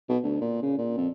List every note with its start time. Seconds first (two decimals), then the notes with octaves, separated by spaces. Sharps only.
0.09 B2
0.24 D2
0.41 A#2
0.62 C#3
0.78 A#2
0.98 F2